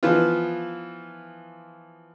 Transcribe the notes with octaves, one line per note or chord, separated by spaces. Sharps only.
E3 F3 B3 F4